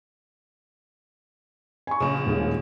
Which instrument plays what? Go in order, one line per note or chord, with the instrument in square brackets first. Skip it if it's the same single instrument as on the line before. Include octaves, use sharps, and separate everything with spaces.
[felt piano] G#5 C#6
[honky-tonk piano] A#1 C#3
[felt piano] D#1 D#3 G#3